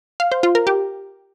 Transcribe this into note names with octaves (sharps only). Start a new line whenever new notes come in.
F5
C5
F4
A#4
G4